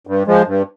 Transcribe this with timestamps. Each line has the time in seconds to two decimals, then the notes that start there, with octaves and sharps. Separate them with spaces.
0.07 G2
0.27 F3 G#3
0.47 G2